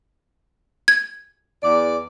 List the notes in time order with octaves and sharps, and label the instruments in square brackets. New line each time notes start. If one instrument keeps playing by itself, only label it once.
[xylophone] G#6
[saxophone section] E2 D5